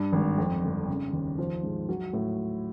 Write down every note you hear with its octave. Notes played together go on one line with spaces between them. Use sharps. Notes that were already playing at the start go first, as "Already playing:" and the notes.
Already playing: G2
G#1
F2
G1
C#3
D#2
F3
G#2
F#3
A2